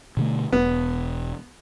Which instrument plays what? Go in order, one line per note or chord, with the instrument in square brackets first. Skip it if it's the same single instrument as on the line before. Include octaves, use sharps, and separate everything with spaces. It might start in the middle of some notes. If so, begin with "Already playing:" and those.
[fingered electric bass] B2 D3 A3
[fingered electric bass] E1 [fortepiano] B3